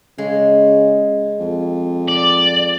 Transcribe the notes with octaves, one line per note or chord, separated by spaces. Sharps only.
C#3 G#3
F2
D5